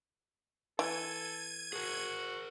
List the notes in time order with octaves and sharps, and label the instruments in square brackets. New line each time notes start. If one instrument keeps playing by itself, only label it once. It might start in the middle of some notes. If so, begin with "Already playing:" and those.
[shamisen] E3 [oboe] A4 [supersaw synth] G#6 D#7
[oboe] F#4 [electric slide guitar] G#4 A#4